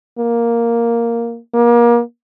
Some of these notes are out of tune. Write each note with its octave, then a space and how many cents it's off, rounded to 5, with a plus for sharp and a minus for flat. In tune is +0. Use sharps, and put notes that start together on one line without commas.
A#3 +0
A#3 +30